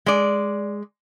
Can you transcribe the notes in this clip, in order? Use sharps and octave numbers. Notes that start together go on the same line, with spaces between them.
G#3 D5